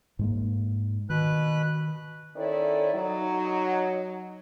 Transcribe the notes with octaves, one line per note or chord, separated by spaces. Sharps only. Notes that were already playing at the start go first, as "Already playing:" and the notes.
G#2 G#3 A#3
B2 D#3 B4 F#6
D#3 C#4 E4 A4 C#5 D5
F#3 D#4